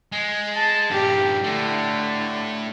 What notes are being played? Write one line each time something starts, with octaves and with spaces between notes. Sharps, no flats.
G#3
A5
G2 A#2 G4
A2 D3 A3